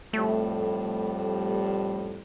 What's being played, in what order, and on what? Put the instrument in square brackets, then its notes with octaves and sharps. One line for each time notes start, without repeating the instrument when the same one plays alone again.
[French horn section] F2 A2 G3 [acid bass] A3